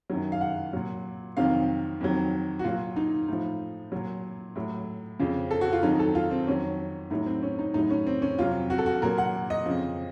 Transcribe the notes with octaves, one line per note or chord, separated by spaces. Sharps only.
F#2 D#3 F#3
F5
F#5
A#2 F#3
F2 C3 D#3 F#3 F5
F2 D#3 F#3
F#4
A#2 F#3 F4
D#4
A2 F3 D#4
A#2 F#3
A2 F#3
F2 C#3 F3
A4
F#4
F4
F2 D#3 F#3 D#4
A4
F4
C4
F2 D#3 F#3 C#4
A2 F#3 D#4
C4
C#4
D#4
A2 F#3 D#4
C#4
C4
C#4
F2 C3 F#3 F4
F#4
A4
F#4
A#2 F#3 A#4
F#5
D#5
F2 C#3 F3